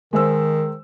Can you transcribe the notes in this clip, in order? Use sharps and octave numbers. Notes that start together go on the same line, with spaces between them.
D#3 G#3 C5 E6